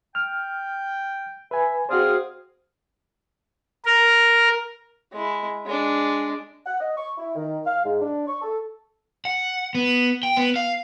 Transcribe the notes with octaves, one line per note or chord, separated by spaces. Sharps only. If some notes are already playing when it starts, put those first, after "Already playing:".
G5 F6
B4 E5 G#5
C4 F#4 G#4 C5 D5 F5
A#4
G#3 E4
G#3 D4
F#5
D#5
C#6
E4
D#3
F5
G#2
D4
C#6
A4
F#5
B3
G5
B3
F5